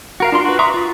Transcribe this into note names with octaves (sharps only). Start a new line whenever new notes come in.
F#4 A#4 F5
D4 F4 F#4 C6
F#4 B4
E5 A#5 C6 C#6 D#6
F4